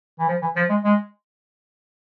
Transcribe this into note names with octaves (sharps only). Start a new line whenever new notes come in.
E3
F3
E3
F3
G#3
G#3